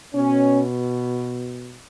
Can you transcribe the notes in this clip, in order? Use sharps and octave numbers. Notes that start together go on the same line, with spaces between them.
B2 C#4